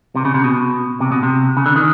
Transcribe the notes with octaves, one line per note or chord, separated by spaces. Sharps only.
C3
C#3
C3
B2
C3
B2
C3
C#3
D3
D#3